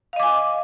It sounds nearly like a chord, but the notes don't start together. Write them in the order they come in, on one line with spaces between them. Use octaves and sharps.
F5 D#5 D6 G#5